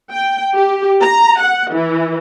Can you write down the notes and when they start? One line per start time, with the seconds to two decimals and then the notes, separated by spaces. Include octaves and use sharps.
0.10 G5
0.55 G4
1.01 A#5
1.40 F#5
1.73 E3